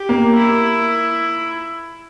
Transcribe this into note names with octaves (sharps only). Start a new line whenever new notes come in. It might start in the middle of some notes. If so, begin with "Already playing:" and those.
Already playing: G4
A#3
E4